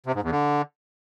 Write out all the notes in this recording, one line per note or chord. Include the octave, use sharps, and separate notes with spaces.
C3
G#2
E2
D3